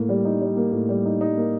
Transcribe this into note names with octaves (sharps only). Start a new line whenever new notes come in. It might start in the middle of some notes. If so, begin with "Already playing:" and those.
Already playing: A2 A#3
G3
D#4
G3
A#3
A2
G3
D#4
D#4
A#3